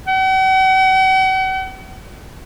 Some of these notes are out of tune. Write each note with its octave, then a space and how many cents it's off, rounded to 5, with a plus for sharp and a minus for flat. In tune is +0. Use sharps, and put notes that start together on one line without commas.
F#5 +45